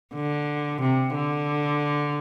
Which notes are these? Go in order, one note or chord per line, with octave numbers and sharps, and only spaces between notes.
D3
C3
D3